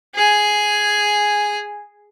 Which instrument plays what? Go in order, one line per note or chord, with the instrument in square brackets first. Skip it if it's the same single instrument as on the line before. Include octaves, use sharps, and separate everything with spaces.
[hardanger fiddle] G#4 G#5